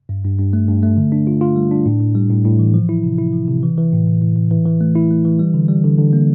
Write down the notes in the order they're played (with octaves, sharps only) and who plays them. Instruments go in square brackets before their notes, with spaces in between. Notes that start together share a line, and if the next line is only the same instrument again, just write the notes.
[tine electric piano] G2
G2
G2
A3
G2
A3
D3
D4
F4
F4
G3
D4
A2
A2
G3
A2
A2
E3
F3
E4
C3
E4
F3
C3
E3
E3
A2
A2
A2
A2
E3
E3
A3
E4
A3
E3
G3
D3
G3
D3
D3
A#3